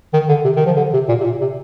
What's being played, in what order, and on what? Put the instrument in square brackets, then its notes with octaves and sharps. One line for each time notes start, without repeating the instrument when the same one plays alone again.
[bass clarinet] D#3
D3
C3
D#3
F3
D3
C3
A#2
C3
A#2
C3